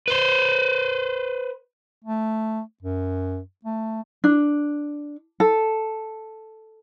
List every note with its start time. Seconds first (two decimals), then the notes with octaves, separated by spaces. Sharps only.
0.08 B4 C5
2.05 A3
2.83 F#2
3.65 A3
4.24 D4
5.40 A4